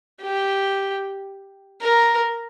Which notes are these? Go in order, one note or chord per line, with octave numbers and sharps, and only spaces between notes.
G4
A#4